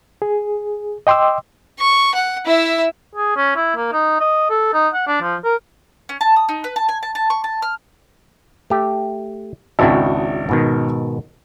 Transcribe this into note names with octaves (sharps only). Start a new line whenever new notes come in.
G#4
D#5 G5 C6 D6 E6
C#6
F#5
E4 E5
G#4
C#4
E4
A#3
D#4
D#5
A4
D#4
F#5
D4
F3
A#4
C#4
A5
D#6
D#4
B4
A5
G#5
A5
A5
C#6
A5
F6
A3 G4
G#1 C#2 D4 E4 F#4 G5
G#2 B2 D#3